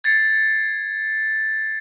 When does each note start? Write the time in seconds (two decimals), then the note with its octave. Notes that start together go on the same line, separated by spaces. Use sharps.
0.04 G#6 A6 C7 C#7